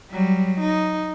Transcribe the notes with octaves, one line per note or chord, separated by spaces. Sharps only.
F#3 G3
D#4